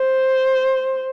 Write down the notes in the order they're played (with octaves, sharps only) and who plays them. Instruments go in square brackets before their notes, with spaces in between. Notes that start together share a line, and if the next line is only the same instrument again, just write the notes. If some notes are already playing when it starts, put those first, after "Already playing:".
Already playing: [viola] C5